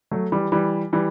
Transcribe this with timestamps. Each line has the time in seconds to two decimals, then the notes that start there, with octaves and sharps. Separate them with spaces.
0.11 F#3 A3
0.32 E3 G3
0.52 E3 G3
0.93 E3 G3